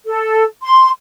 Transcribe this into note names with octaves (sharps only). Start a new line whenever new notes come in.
A4
C6